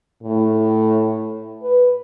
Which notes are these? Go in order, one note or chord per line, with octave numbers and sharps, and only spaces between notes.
A2
B4